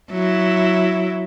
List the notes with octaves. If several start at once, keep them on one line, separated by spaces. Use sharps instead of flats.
F#3 E4